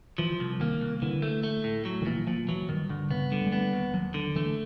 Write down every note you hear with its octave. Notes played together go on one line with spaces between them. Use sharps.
E3 F3
C2
D#3 A#3
C2
D3 E3
A3
A3
A2
F#3
D#3
A#2 E3
A#2 F3
E3 F#3
G2 D#3
G2 D3
C#3 B3
D3 G3
G#3
G3 B3
D#2
D#2 F#3
D3
E3 A3